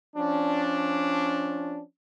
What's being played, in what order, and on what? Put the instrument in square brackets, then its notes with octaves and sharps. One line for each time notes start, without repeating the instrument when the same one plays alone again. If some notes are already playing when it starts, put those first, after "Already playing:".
[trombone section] F3 C#4 D4